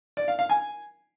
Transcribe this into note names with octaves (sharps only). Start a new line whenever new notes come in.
D5
F5
F5
G#5